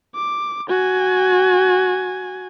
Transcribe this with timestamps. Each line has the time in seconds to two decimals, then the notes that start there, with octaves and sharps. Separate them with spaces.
0.15 D6
0.69 F#4 G#5